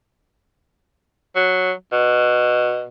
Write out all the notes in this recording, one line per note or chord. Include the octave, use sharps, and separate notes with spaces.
F#3
B2